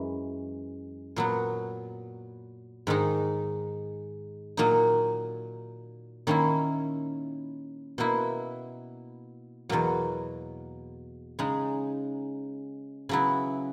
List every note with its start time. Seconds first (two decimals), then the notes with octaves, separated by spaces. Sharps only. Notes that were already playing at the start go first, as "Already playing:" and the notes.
Already playing: F#2 E3 G#3
1.16 A#2 F#3 B3
2.87 G#2 D#3 G#3 D#4
4.57 A#2 F#3 A#3 D#4
6.27 D#3 A#3 C#4 E4
7.98 B2 A#3 E4
9.69 E2 B2 F#3 A#3
11.39 C#3 G#3 D#4
13.09 C#3 F#3 B3 E4